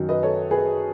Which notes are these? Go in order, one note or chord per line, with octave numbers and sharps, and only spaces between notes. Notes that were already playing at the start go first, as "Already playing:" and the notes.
Already playing: F#2 D#3 F#3
B4 D#5
A4 C#5
G#4 B4